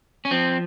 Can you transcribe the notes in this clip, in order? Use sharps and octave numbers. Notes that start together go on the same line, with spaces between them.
C#4
F3 C4